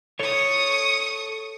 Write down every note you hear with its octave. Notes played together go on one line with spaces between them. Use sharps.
A4 C#5 C#6 D#6